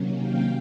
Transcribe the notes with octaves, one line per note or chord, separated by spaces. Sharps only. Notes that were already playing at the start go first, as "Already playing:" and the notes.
Already playing: C3 D#3 F#3 A#3 C#4
F5 G5